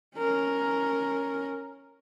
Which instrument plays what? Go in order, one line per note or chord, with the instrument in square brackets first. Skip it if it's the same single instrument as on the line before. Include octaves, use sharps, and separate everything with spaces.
[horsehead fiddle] C#4 A#4